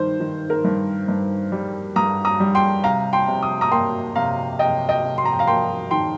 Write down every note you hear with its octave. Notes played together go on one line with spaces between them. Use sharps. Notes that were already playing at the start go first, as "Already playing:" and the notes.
Already playing: G2 D#3 C5
D#3
A#4
G2
G2
G3
G2 A#5 D#6
A#5 D#6
G3
G5 C6
C3 F5 A#5
G5 C6
C3
D#6
A#5 D#6
A#3 G5 C6
C3 F5 A#5
C3 D#5 G5
D#5 G5
C3
C6
A#5
G5
F5 A#5
A#3 G5 C6
D#3 G5 C6